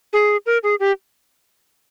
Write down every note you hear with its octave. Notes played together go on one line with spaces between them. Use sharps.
G#4
A#4
G#4
G4